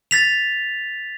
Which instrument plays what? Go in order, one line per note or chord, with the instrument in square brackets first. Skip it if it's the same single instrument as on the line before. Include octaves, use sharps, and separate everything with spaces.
[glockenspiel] A6 B6 F7